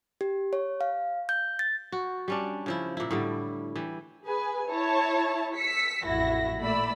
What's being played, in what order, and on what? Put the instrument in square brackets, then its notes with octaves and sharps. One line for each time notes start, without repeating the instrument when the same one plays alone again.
[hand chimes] G4
C#5
F5
G6
A6
[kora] F#4
G3 C#4 D4
C#3 F3 E4
A#2 E4
A2 D3 G3
E3 G3
[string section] G#4 B4 G#5
E4 C#5 A5
E6 B6 C#7
A1 F2 E4 F#4 A#6
A#2 A3 D5 B5 E6